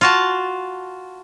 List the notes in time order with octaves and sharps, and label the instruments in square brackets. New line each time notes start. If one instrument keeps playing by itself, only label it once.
[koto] F4 F#4 A5